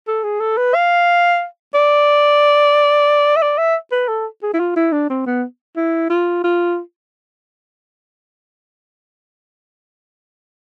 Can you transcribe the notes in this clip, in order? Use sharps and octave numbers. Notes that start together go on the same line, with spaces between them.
A4
G#4
A4
B4
F5
D5
E5
D5
E5
B4
A4
G#4
E4
F4
E4
D4
C4
B3
E4
F4
F4